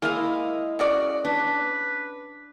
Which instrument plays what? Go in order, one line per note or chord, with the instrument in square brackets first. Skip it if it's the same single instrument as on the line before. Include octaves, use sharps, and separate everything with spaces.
[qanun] G#3 E4 D#5 [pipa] A#3 F5
[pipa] C#3 F#4 D5
[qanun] D4 [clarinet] B4